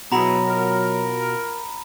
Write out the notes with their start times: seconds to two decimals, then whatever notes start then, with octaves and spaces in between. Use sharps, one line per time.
0.12 B2 F#3 B3 E4 F#4 G#4 A#5 B5
0.47 F4 A#4